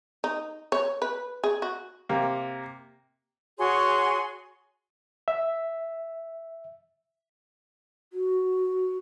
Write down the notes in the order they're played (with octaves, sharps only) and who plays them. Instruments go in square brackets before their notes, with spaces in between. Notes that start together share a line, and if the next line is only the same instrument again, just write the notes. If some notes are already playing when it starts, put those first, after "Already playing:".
[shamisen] D#4
C#5
B4
G#4
F#4
[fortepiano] C3 A#3
[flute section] F#4 G#4 C#5 C6
[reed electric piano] E5
[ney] F#4